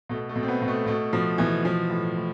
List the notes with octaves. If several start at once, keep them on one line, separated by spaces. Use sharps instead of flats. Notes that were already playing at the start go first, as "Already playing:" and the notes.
B2 A3
A3
B2
C4
B3
B2
A3
B2 A3
B2 F3
B2 E3
E3 F3
A2
A2